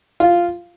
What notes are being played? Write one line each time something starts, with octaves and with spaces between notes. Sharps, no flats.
F4